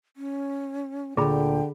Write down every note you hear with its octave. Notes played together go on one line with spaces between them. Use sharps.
C#4
D2 A#2 D3 G#4 G5 B5